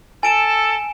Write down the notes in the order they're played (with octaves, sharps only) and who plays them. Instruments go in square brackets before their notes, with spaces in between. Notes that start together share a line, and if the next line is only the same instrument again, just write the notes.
[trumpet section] A4 [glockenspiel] G#5 D7 E7